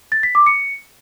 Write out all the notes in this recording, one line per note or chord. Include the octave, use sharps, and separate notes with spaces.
A6
B6
D6
C#7